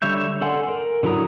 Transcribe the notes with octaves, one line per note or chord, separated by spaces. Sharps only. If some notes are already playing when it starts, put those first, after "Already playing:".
D3 G3 C#5 E5 G6
A4 D5 F#5 G#5 C6
A#4
D3 F#3 E4 A#5 D#6